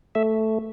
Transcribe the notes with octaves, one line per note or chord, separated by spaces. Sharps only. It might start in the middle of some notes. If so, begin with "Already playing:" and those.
A3 E5